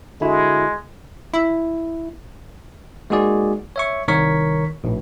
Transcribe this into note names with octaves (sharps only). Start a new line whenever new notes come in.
D3 G#3 E4 F#4
E4
G#3 A#3 D#4 F#4 G#4 D5
C#5 E5 C#6
C2 D#3 A#4 C#5 C#6 B6
A#1 A2